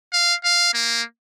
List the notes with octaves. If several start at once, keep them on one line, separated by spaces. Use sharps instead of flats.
F5
F5
A#3